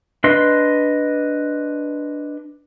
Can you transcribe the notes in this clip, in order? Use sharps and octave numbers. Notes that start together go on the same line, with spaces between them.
D4 B4 D#5 C6